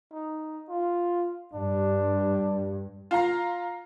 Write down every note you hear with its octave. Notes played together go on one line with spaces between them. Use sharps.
D#4
F4
G2 D4
F4 F5 A#5 C7